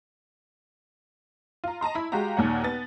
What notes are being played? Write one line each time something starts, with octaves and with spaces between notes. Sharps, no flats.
F4 A#5
D#5 A5 A#5 C6
E4 B5
G#3 F#4 G4 F5 A#5
D#2 A#2 C#5 F#5
B3 A6